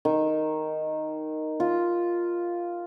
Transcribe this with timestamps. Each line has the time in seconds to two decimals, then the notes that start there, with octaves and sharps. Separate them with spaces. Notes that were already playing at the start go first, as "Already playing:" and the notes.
0.05 D#3
1.60 F4